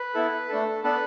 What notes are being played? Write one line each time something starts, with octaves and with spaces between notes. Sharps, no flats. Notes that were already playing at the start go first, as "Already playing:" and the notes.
Already playing: B4
B3 E4 A4
A3 D4 A4
B3 D4 A4 B4